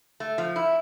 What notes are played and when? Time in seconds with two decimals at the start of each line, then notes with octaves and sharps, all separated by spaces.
0.20 A3
0.38 F3
0.56 E4